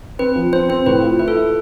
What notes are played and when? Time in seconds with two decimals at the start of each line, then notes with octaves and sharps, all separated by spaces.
0.19 C4 B4
0.35 F3
0.53 C4 C5
0.69 C4 C5
0.86 A2 B4
1.02 F4
1.19 E4 B4
1.28 A4
1.36 E4